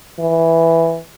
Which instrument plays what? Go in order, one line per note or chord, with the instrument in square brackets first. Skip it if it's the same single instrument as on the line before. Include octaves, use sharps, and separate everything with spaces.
[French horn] E3